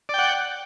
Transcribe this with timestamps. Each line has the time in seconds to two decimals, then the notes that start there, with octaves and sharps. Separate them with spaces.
0.09 D5
0.14 G5
0.19 F#5